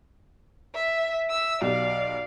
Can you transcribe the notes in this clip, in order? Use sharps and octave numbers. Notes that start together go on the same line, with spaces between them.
E5
E5 E6
B1 G4 D5 F5